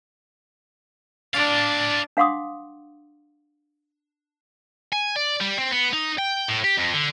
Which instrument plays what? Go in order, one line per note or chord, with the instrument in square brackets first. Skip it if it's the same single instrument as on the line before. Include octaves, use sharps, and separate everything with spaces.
[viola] D4 [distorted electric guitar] D5 F5 [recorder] A6
[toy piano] D4 F5 F#5 C6 D6 D#6
[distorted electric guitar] G#5
D5
G3
C4
B3
D#4
G5
A2
G4
F2
D3